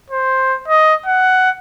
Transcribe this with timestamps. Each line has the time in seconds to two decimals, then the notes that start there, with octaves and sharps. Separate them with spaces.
0.11 C5
0.68 D#5
1.06 F#5